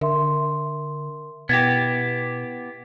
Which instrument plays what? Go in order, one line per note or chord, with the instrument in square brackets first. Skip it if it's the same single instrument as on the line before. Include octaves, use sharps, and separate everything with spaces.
[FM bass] D3 [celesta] A#4 E5 C6
[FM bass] B2 [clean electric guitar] B3 E4 G4 [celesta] G#6 A#6